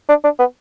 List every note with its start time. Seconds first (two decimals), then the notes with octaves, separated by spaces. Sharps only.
0.09 D4
0.24 D4
0.39 B3